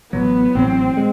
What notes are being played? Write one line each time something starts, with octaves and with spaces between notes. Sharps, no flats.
A1 A2 F#3 B3
A1 A2 F#3 C4
G#3